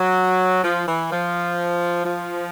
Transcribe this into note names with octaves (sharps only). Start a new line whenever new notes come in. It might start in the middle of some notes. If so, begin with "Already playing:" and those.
Already playing: F#3
F3
E3
F3
F3